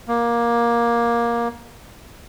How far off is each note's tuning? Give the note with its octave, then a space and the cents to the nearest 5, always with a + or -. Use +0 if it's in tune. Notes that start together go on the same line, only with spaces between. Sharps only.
A#3 +15